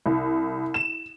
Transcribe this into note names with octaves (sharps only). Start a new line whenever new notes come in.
C2
E7